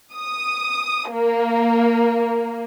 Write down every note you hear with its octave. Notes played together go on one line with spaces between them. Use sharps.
D#6
A#3